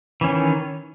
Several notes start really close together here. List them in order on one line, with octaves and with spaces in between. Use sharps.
E3 C#4 D#3